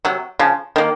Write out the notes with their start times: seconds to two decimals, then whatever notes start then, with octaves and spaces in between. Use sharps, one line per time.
0.05 C3 F#3
0.39 C#3 F3
0.76 D#3 A#3